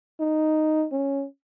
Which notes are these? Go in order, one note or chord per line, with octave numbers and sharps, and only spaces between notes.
D#4
C#4